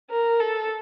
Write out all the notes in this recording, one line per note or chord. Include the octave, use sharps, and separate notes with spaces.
A#4
A4